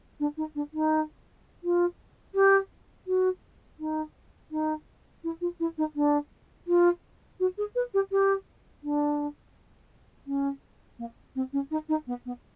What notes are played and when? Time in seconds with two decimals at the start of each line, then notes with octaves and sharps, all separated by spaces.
0.20 D4
0.37 D#4
0.55 D4
0.73 D#4
1.63 F4
2.34 G4
3.07 F#4
3.79 D#4
4.51 D#4
5.24 E4
5.41 F4
5.60 E4
5.78 D#4
5.96 D4
6.67 F4
7.40 F#4
7.58 G#4
7.75 B4
7.94 G4
8.11 G4
8.83 D4
10.27 C#4
10.99 A#3
11.35 C4
11.53 C#4
11.71 D#4
11.89 D#4
12.07 B3
12.25 B3